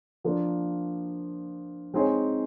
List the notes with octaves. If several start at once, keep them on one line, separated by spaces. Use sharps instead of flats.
F3 A#3 D4
G#3 C4 D#4 G#4 C#5